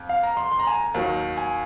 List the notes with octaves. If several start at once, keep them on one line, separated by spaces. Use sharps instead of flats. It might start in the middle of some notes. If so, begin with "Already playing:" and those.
Already playing: F2
F5
A#5
C6
C6
A#5
G#5
A#5
D#2 D#3 F#3
G#5